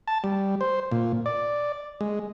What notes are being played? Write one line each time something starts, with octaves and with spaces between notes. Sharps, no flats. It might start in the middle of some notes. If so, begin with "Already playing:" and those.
A5
G3
C5
A#2
D5
G#3